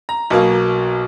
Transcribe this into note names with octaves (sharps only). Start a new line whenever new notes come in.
A#5
B1 B2 A#3